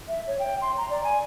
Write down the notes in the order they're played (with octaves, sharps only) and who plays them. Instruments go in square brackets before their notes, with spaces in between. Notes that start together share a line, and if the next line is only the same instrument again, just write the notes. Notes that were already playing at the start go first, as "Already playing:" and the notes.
[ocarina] E5
C#5
G5
C6
A#5
D5
G#5